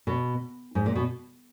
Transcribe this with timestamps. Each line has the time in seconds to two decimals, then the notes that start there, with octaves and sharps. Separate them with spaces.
0.07 B2
0.75 G#2
0.86 A#2
0.95 B2